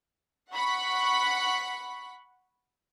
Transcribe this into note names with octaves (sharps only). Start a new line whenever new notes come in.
F#5 B5 C#6 B6